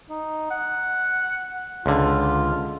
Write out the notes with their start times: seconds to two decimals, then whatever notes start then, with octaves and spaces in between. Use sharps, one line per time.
0.10 D#4
0.51 F#5
1.86 C#2 D3 F4